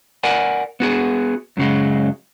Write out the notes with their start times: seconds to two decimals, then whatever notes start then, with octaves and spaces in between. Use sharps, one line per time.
0.23 A#4 D5 F#5 G#5
0.80 B3 F#4 G#4
1.57 F#2 C#3 F#3 G#3